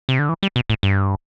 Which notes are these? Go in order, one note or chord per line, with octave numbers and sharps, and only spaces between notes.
C3
D3
E3
G3
B2
A2
G2